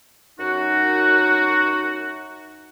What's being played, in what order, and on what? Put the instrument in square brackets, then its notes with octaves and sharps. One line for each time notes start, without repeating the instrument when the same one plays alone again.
[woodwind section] F#2 D#4 F#4